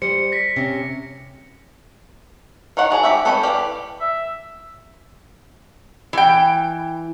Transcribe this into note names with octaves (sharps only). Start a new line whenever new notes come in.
G3 C5 C#7
A#6 B6
C3 C#4
D#3 D4 C#5 F#5
F#4 G#4 C#5 A5
C#4 G4 E5
C4 A4 B4 C#5 G5
E3 G4 D5 F5
E5
E3 G5